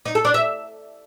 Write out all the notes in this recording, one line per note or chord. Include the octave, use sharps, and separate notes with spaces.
D#4
A4
D4
E5